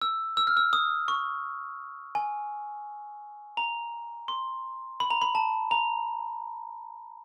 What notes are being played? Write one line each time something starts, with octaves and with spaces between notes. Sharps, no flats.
E6
E6
F6
E6
D#6
C#6
G#5
A#5
C6
B5
A#5
B5
A5
A#5